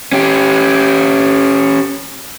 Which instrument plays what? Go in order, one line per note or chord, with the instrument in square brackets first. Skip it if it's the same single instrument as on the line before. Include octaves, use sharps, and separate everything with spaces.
[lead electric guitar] C#4 G4